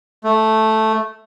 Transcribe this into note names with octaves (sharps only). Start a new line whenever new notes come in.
A3